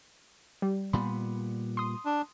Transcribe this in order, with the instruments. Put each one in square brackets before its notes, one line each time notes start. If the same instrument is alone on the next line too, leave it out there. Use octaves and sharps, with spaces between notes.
[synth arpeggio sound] G3
[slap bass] A#2 G3 B3 [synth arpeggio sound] B5 C6
[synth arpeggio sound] C6 D#6
[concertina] D4